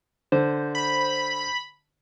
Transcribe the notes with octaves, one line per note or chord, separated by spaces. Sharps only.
D3 C5
B5